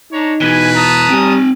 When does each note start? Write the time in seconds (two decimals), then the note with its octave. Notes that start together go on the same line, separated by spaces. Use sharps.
0.12 D4 D#4 C#5 A#5
0.41 B2 E3 B4 G#5
0.74 A5 A#5 D#6
1.10 G3 C4 G#5